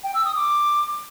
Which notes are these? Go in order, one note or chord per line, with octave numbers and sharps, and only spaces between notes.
G5
E6
D#6
D6